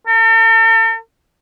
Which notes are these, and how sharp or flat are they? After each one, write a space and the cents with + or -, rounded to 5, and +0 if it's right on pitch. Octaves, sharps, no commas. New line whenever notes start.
A4 +45